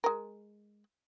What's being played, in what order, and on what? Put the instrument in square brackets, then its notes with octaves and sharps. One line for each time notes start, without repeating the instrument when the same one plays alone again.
[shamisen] G#3 A#4